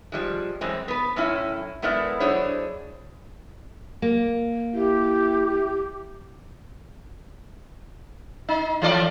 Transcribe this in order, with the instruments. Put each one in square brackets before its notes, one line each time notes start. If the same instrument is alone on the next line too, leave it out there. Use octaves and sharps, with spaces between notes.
[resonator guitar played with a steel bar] F3 G3 G#3
F#2 E3 G#3 C4
B3 B4
F#2 A2 C#4 E4
G#3 A3 B3 E4 A#4 D5
F#3 D4 E4 G#4 C5 C#5
[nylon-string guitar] A#3
[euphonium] E4 [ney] G4
[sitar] D#4
E3 A3 D5